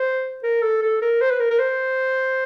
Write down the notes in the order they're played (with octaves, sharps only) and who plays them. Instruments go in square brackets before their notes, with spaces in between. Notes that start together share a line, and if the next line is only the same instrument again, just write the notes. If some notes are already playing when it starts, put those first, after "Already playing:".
Already playing: [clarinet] C5
A#4
A4
A4
A#4
C5
B4
A#4
A#4
C5